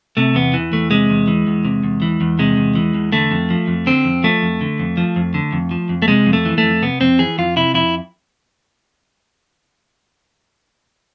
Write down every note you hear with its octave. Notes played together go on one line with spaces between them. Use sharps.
C3 A3
E2 B3
E3
E2 A3
C3 G#3
E2
E3
E2
C3
E2
E3
E2
C3 G#3
E2
E3
E2
D3 A3
F2
F3
F2
D3 C4
F2
F3 A3
F2
D3
F2
F3
F2
D3
F2
F3
F2
A3
C3 G#3
F2
A3
E3
A3
F2
C3 B3
F2 C4
E3 G#4
F2 F4
C3 E4
F2 E4